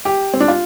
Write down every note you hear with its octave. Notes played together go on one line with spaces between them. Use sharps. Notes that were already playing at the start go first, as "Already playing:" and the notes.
G4
C4
D4
F4